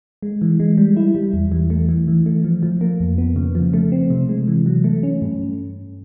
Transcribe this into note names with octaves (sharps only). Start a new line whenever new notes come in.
G#3
E3
G#3
G3
E4
G3
E2
E3
A3
E3
E3
A3
F3
F3
A#3
F2
B3
C#3
F3
A3
C4
C3
G#3
E3
F#3
A3
C#4
G2